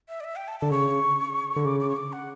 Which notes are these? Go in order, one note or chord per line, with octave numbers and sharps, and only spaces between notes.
E5
D5
E5
G5
A5
D3 A5
C#3 C#6
D3
C#3 D6
D6
C#6
D6
F#5